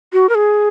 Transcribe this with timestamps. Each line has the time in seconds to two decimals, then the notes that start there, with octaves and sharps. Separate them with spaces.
0.13 F#4
0.29 A#4
0.35 G#4